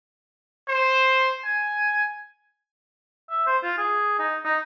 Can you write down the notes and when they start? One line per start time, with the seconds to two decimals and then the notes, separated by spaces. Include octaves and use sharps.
0.68 C5
1.45 G#5
3.30 E5
3.47 C5
3.63 F4
3.78 G#4
4.19 D#4
4.45 D#4